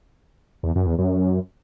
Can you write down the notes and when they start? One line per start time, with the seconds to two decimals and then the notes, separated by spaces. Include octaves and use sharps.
0.63 E2
0.75 F#2
0.86 E2
0.99 F#2